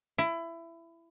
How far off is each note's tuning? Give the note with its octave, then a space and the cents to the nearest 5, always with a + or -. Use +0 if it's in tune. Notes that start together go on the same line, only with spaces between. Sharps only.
E4 +20